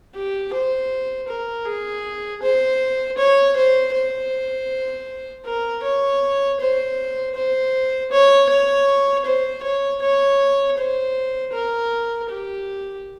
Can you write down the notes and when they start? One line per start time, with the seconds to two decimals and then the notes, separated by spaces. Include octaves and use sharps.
0.14 G4
0.52 C5
1.28 A#4
1.65 G#4
2.42 C5
3.18 C#5
3.56 C5
3.94 C5
5.45 A#4
5.83 C#5
6.60 C5
7.35 C5
8.12 C#5
8.49 C#5
9.25 C5
9.63 C#5
10.02 C#5
10.77 C5
11.53 A#4
12.29 G4